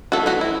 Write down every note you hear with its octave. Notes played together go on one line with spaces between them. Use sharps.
E3 A3 C4 F#4 A4
D#4 F#4
E4